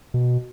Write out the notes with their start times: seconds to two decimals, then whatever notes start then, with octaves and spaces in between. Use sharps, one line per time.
0.14 B2